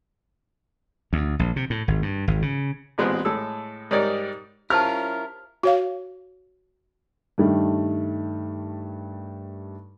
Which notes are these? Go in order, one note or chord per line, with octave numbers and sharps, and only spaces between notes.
D2
A#1
C3
A2
G#1
G2
G#1
C#3
A1 A#2 G#3 B3 C4 B4
A2 G#3 A4 E6
G#2 G3 D#4 A#4 C#5 D5
C#4 E4 F4 G4 A#4 C5 A5 F6
F#4 C#5 F5
G2 D#3 G3 A3